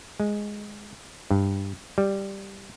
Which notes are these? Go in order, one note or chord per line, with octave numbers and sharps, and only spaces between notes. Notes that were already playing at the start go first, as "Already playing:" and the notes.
G#3
G2
G3